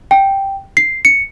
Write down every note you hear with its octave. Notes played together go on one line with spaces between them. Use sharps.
G5
C7
C#7